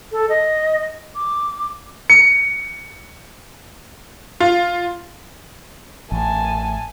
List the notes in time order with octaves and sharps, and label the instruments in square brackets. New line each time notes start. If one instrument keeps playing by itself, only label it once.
[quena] A4
D#5
D6
[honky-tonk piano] C#7
F4
[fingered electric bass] A1 [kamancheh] G#5 A5